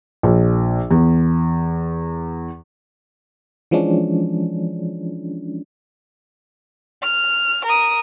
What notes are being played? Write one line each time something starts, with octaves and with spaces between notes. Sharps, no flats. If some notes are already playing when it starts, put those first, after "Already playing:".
A#1
E2
E3 F3 G#3 C#4 D4
F6
A#4 D#6